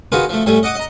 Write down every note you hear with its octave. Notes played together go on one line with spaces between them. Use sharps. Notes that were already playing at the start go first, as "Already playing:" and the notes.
D#3 F4 F#4 G#4 B4
F3 A3
A2 G3 A3 G#5
D#5 F#5 D6 D#6
D#5 A#5